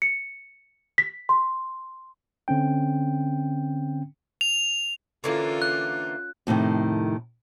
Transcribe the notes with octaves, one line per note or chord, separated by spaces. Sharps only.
C#7
B6
C6
D3 C4 C#4 G5
F7
D3 E3 A#3 C#4 F4
F#6
F2 A2 C3 D#3